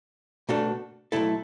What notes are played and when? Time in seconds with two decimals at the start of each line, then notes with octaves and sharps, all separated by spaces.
0.49 B2 A3 D4 F#4 A4
1.12 B1 B2 A3 E4 A4